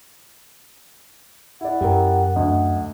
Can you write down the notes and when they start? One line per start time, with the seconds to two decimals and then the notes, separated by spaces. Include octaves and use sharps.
1.61 E4 D5 F#5
1.81 F#2 G4 A#4
2.36 D2 D3 D#5